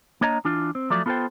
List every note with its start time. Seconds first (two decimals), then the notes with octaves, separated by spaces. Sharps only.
0.21 A#3 D4 C#5 D#5 A#5
0.45 E3 D4 F4
0.75 C4
0.90 F3 F#3 A3 D5
1.06 B3 F4 A4 A#4 C5 G5